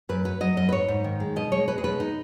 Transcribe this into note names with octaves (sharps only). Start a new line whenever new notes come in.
F#2 B4
F#3 B4
F#3 D#5
F#2 D#5
B4
G#2 C#5
G#2
D#3
G#3
B2 D#5
G#3 C#5
G#3 B4
G#4
B2 B4
D#4